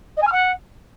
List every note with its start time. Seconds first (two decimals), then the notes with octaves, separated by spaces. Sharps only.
0.17 D#5
0.22 G#5
0.27 F6
0.32 F#5